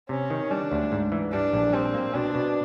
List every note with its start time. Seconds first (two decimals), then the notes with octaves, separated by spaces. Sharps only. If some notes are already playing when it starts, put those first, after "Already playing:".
0.09 C3 C#4
0.30 D#3
0.51 G3 D4
0.72 D2
0.92 G#2
1.12 E3
1.33 G3 D4
1.53 A#1
1.73 G3 C4
1.94 A#3
2.14 B2 D4
2.35 B2